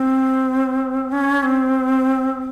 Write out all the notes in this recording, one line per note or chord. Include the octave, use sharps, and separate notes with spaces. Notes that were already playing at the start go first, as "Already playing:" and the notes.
Already playing: C4
C#4
C4